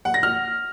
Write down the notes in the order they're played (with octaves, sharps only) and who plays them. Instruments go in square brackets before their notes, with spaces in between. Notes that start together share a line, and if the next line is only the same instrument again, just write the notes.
[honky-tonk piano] F#5
A#6
F6